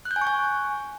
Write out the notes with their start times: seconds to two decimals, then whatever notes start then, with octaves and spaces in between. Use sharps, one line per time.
0.05 F#6
0.11 G6
0.16 G#5
0.21 C#6
0.27 G#5